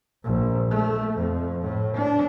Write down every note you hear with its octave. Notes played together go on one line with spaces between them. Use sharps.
A#1
A3
F2
A2
D4